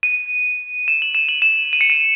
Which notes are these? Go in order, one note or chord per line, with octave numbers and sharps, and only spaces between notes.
D#7
E7
F#7
E7
F#7
E7
D#7
C#7
D#7